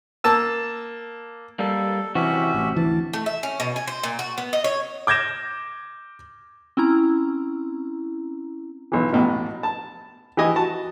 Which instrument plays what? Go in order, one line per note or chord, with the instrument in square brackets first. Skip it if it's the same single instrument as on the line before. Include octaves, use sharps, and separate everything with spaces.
[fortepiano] A#3 A5 E6
[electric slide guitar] G3 A#3 [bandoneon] A4
[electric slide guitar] C3 C4 F#4 [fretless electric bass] E3 [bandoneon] C#4 G4 E5
[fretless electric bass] A1
[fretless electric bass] D2 E3 [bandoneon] A5
[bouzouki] A3
E5
C#4
B2
G#5
C5
A#2
F#4
B3
D#5
C#5
[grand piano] D6 G6 G#6 A#6 E7
[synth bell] C4 C#4 E4 A#5
[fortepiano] B1 E3
A1 B2 G5
A5
E3 G4 D#5 G#5
F#4 A5